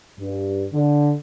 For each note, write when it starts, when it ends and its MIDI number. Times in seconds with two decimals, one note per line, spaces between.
0.19 0.66 43
0.73 1.14 50